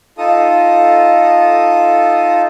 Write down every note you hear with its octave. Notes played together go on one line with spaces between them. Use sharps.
D#4 F4 A4 D#6